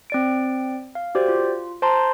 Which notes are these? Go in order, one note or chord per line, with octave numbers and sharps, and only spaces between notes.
C4 D5 D7
F5
F#4 G4 C5 D5
F4
C5 A5 A#5 C6